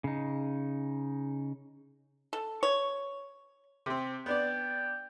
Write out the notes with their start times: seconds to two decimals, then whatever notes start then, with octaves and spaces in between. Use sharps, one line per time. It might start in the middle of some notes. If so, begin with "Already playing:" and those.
0.04 C#3 D#4
2.33 A4
2.63 C#5
3.86 C3 C4
4.26 B3 D4 D5 G5